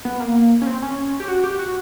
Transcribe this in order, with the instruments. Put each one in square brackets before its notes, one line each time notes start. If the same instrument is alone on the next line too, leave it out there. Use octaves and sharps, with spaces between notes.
[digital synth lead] B3
A#3
C#4
C4
C#4
G4
F#4
G4
F#4